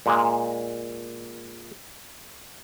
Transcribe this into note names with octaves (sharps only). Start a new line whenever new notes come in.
A#2 G#3 A#3